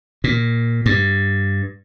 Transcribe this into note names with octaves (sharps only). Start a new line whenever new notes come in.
A#2
G2